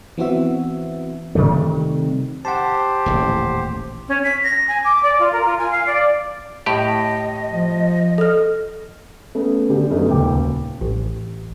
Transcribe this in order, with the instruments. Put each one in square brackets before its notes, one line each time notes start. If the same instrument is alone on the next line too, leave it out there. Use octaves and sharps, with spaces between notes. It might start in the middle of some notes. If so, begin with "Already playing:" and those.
[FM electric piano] E3 B3 C4 F#4 E5
[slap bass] C3 D#3 G3 A3
[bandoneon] G4 C5 [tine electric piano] F#5 A5
[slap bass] D#1 A1 C#3
[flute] C#4
B6
A#6
G#5
D6
D5
F4
A#4
F4
G#5
F5
D5
[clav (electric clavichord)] A2 G4 [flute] D#5
[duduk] F3
[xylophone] A4 F6 [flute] D#5
[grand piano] A3 B3 C#4
D3 G4
F#2 A3 B3 D#4
D#1 C#2 G5 D6
[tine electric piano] A1